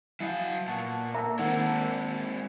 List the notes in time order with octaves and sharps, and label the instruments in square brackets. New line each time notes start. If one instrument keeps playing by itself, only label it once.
[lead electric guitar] F#3 F5 [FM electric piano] E4 D#5 F#5 [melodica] G#5 A5
[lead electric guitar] A#2 [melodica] B3 F#5 C#6 [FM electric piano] A5
[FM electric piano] A#3 [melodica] D4 A4 [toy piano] E5 A#5
[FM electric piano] D#3 A#3 [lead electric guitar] G#3 C4 [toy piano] F#5